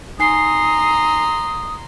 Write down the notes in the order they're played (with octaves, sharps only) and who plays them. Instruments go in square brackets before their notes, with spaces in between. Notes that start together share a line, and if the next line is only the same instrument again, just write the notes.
[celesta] D#4 G#5 C7 [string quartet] A#5 C6 [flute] D#6